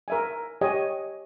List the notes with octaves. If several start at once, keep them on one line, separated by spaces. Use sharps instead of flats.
A#4 E5 G#5
G4 C#5 D#5 G#5